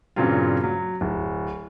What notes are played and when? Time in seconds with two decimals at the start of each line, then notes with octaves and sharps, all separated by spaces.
0.16 G2 A#2 C#3 F#3 C4 F4
0.64 F#3
1.01 D1